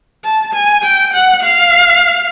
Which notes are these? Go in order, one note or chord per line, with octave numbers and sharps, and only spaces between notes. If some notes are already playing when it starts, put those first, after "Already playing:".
A5
G#5
G5
F#5
F5